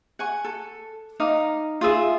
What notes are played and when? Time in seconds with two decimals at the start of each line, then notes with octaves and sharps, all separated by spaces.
0.19 F#5 G#5 C#6
0.45 A4
1.20 D#4 F5 D6
1.81 F4 G#4 E5